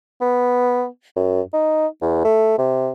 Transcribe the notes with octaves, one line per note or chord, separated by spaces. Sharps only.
B3
F#2
D#4
E2
A3
C3